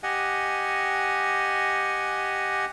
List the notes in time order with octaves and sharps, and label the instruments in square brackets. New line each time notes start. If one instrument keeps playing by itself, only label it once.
[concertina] G4 D#5 F#5 G#5